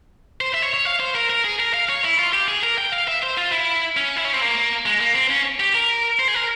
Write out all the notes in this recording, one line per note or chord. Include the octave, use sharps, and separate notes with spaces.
C5
E5
C#5
C#5
F5
C5
A#4
A#4
G#4
A#4
F5
C#5
E4
F4
G4
G#4
A#4
G5
F5
E5
C5
F4
E4
C#4
E4
C#4
C4
A#3
G#3
A#3
C4
C#4
G4
A#4
C5
G#4
A#4